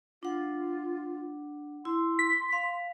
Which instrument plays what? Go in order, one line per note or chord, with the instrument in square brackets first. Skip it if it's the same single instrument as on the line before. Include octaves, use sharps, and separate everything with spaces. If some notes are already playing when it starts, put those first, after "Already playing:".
[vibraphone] D4 F#5 [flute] F4
[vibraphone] E4 [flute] C6
[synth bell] B6
[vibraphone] F5